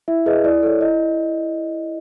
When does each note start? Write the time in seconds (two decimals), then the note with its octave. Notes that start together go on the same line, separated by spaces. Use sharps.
0.08 E4 E5
0.26 G#4 B4 D#5
0.44 E4 D5
0.63 A4 C#5
0.81 E4 D#5